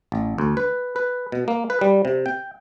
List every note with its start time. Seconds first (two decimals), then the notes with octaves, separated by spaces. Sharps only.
0.12 A1
0.38 D2
0.57 B4
0.96 B4
1.32 B2
1.48 A#3
1.70 B4
1.81 G3
2.05 C3
2.26 G5